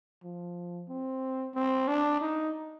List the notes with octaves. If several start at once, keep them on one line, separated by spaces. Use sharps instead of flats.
F3
C4
C4
D4
D#4